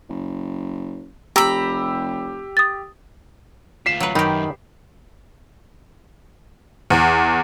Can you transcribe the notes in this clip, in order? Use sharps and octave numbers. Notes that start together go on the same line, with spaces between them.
F#1
F1 G4 A#5 B5 E6
D#6 A6
D2 F4 B6 C7 E7
F#3 B4
F#2 D#3 D#4 G4 B5
E2